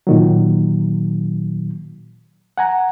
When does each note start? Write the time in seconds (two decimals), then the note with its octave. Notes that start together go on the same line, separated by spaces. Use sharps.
0.07 A#2 D#3 F#3
2.58 F#5 G#5 A#5